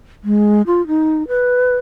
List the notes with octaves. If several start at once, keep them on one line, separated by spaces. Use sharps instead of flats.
G#3
F4
D#4
B4